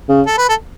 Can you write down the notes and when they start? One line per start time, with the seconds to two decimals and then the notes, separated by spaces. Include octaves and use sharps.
0.09 C#3
0.27 A4
0.38 B4
0.49 A4